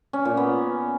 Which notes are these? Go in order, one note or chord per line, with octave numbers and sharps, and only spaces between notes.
C#4
A#2
B3